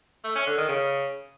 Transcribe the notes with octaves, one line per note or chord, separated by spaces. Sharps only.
A3
C#4
D3
D#3
C#3